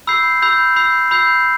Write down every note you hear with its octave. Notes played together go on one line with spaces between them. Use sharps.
B5 E6 G6 C7
B5 E6 G6 C7
B5 E6 G6 C7
B5 E6 G6 C7